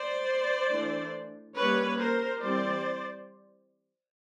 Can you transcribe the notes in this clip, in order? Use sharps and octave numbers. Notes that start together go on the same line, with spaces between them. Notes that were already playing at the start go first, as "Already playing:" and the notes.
Already playing: C5 D5
E3 A3 D4
G3 A#3 C#4 B4 C#5
A#4 C5
E3 G3 C4 C5 D5